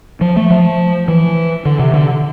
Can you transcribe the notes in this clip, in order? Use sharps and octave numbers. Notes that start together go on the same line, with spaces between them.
F3
A3
F3
E3
D3
C3
D3